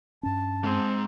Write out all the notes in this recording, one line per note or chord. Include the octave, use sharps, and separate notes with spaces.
G2 C#4 A5
G#2 G#3 C4